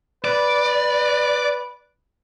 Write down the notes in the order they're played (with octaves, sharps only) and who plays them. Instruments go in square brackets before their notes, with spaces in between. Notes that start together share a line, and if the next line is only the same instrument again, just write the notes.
[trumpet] B4 [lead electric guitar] D5